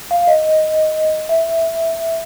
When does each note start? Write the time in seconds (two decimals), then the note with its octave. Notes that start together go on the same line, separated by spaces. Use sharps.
0.11 F5
0.27 D#5
1.29 E5